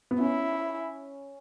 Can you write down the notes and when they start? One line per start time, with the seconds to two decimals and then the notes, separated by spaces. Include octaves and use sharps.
0.11 B3
0.20 C#4 E4